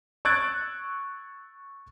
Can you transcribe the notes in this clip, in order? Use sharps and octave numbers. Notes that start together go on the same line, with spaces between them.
C#6 E6 F#6 G#6 A6 D7